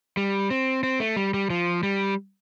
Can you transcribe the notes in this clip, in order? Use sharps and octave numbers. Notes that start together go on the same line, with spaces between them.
G3
C4
C4
A3
G3
G3
F3
G3